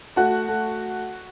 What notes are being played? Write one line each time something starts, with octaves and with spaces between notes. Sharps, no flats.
A3 F#4
A3